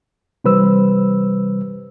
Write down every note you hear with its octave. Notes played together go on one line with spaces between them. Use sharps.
C3 E3 G3 B4 C5 E6